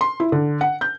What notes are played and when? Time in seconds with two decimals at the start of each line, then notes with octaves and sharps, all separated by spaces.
0.01 C6
0.20 E4
0.32 D3
0.61 F#5
0.81 G6